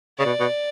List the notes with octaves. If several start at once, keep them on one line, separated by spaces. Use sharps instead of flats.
C#3 D5
B2
B2